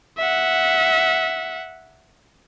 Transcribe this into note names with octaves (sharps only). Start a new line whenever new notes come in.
E5 F#5